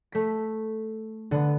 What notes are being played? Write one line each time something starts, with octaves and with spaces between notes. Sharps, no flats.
A3 B6
D3 B3